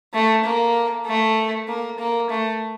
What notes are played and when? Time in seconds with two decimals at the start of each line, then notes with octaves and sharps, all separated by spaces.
0.13 A3
0.44 A#3
1.06 A3
1.68 A#3
1.99 A#3
2.30 A3